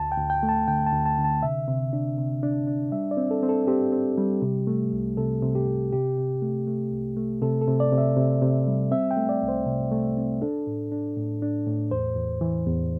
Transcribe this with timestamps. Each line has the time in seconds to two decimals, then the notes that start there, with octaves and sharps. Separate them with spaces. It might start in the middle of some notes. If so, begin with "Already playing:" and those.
Already playing: D2 A5
0.12 G5
0.18 D2
0.30 G5
0.43 A3
0.49 A5
0.68 D3 G5
0.86 A5
0.92 D2
1.06 A5
1.18 D3
1.24 A5
1.43 C3 E5
1.68 C3
1.93 D4
2.18 C3
2.43 D4
2.67 D4
2.92 G3 E5
3.11 D5
3.17 C4
3.31 A4
3.43 C4
3.49 A4
3.67 C4 G4
3.92 C4
4.18 G3
4.42 C3
4.67 A3
4.93 C2
5.17 C3 A4
5.42 C3
5.55 G4
5.67 C3
5.92 C3 G4
6.18 C3
6.42 A3
6.67 A3
6.92 C2
7.17 A3
7.42 C3 A4
7.61 A4
7.68 C3
7.80 D5
7.92 C3
7.98 E5
8.17 C3
8.42 C3
8.67 G3
8.91 C4 E5
9.11 G5
9.17 A3
9.29 D5
9.42 C2
9.48 C5
9.66 C3
9.92 A3
10.17 C4
10.42 D4 A4
10.67 A2
10.92 D4
11.17 A2
11.42 D4
11.67 A2
11.91 E2 C5
12.16 E2
12.41 E3
12.67 E2